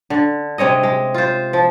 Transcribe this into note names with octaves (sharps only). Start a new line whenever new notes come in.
D3
C3 G#3 C#5 D#5
G#3
F4 C5
F3